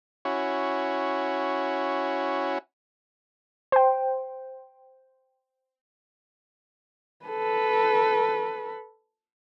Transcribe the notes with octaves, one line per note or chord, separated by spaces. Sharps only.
C#4 E4 F#4
C5 G5
A4 B4